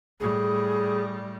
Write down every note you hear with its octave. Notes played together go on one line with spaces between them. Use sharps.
A2 G3 G#4